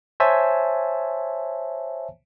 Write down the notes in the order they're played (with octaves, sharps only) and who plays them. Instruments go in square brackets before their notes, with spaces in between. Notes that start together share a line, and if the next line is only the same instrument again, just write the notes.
[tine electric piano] C5 C#5 E5 G#5 A5